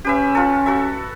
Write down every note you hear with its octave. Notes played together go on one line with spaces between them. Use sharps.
C#4 G4 B4 E5
F4 A4
F#4 A4 E5